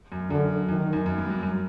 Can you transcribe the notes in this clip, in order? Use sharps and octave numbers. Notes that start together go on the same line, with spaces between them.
F#2
F#2 D3
F#2 D#3
F#2
F#2
G2
G2
F#2